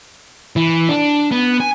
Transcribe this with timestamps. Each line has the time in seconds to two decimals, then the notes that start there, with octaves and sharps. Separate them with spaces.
0.56 E3
0.89 D4
1.32 B3
1.60 G#5